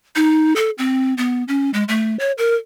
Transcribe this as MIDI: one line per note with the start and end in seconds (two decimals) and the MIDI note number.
0.16 0.54 63
0.56 0.70 69
0.78 1.14 60
1.18 1.44 59
1.48 1.70 61
1.74 1.84 56
1.88 2.18 57
2.19 2.32 73
2.38 2.55 70